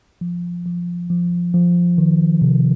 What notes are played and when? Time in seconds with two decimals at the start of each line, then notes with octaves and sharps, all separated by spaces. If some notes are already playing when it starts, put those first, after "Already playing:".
0.21 F3
0.66 F3
1.10 F3
1.54 F3
1.98 D#3
2.42 C3